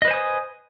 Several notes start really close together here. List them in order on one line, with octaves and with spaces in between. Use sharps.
D#5 B4 C5 G#5 D#6